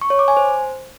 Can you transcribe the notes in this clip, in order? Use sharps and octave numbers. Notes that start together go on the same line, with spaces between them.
C#6
C#5
D6
G#5
C5